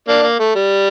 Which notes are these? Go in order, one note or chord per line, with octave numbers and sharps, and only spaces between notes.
A#3 D4
A#3
A3
G3